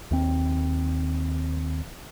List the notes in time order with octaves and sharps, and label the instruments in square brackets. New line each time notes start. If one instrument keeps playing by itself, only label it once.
[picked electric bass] D#2 C4